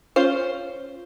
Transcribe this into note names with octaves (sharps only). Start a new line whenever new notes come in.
C#4 F4 C5